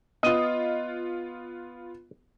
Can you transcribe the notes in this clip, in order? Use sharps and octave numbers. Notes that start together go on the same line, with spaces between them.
B3 F4 D#5